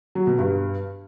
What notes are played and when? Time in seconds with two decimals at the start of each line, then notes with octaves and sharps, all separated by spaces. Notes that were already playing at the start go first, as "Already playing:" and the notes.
0.15 F#3
0.27 B2
0.38 G2